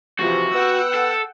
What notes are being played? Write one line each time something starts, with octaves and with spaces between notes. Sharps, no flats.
C3 E3 F3 F#4
B3 F#5 G5 E6
A4